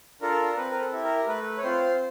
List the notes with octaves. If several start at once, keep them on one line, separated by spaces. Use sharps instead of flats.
D4 F4 A4 A#4
C4 B4
A#4
A4
E4 G4
A#4
A3 B4
C#5
C4 F4 C5